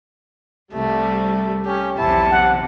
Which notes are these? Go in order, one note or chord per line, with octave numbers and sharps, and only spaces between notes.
C2 G3 A3
C#4 G4
B1 E2 C3 E4 A5
F#5